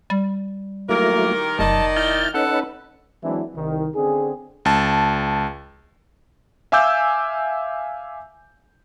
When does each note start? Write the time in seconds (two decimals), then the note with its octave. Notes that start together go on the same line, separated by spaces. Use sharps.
0.10 G3
0.89 D#3 F#3 A3 A#3 E4 G4 A#4
1.59 F1 F#2 D#3 D5 D#5 A5
1.97 E4 A5 F6 G6
2.34 C#4 D#4 A4 B4 F#5 A5
3.23 E3 F#3 G#3 C4 D4 E4
3.56 C2 D#3
3.95 D3 C4 C#4 G#4
4.65 C#2 A5
6.72 E5 F5 G#5 D6 E6 G6